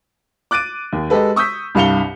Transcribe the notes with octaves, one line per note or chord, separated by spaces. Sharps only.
D6 F#6 A6 D7 D#7
D#2
G#3 G4 A4 B4
C#6 D#6 E6 G6 B6
C2 G2 F5 C#7 F7 G7